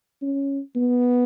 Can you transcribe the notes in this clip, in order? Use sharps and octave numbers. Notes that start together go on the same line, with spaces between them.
C#4
B3